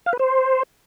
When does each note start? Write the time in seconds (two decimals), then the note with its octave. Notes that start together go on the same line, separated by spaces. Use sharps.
0.06 F5
0.13 B4
0.19 C5